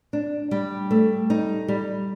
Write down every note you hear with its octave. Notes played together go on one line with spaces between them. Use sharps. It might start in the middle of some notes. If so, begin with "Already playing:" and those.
D4
G3
A3
D#4
G3